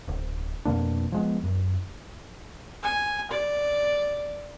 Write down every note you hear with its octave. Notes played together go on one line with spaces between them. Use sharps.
D1
F2 B2 A#3 D4
F3 G#3 B3
F#2
G#5
D5